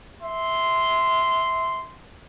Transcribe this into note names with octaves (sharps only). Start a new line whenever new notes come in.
E5 C6